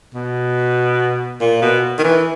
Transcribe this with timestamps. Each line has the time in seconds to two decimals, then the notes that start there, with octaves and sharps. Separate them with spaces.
0.14 B2
1.41 A#2
1.62 B2
1.99 D#3
2.04 E3